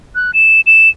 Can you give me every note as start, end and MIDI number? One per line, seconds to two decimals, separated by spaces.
0.15 0.31 90
0.34 0.61 100
0.66 0.89 100